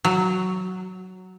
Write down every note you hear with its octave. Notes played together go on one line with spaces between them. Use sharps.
F#3